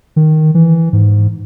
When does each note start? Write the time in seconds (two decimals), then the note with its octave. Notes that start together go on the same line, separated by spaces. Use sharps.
0.16 D#3
0.55 E3
0.93 G#2